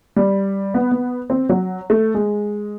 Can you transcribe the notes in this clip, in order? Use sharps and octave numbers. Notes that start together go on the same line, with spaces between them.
G3
B3
B3
C4
F#3
A3
G#3